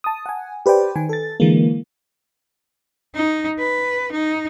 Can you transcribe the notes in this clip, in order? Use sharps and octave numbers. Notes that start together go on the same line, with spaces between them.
A5 D#6
F#5 G#5
G4 B4 C5 D5 G5
D#3 G#5
A4 A6
D3 E3 G#3 A#3
D#4
B4
D#4